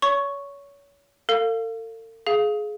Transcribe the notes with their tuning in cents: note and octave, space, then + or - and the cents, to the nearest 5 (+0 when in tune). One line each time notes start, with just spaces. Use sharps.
C#5 +30 C#6 +0
A4 +45 F5 +0
G#4 +20 F5 +0